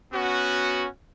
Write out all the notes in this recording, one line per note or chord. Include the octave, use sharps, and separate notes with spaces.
B3 C#4 F#4